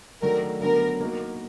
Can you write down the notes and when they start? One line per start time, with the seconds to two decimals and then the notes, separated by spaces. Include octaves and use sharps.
0.22 D#3 F#3 A3 D4 A#4
0.61 D3 F#3 B3 A#4
1.00 A#3 D#4 F#4 A#4